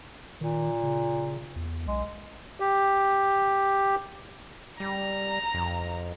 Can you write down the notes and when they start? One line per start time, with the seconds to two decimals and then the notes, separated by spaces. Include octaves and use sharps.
0.41 A#2 D#3
0.83 C#3
1.56 E2
1.88 B1 G#3
2.60 G4
4.80 G3 A#5
5.54 F2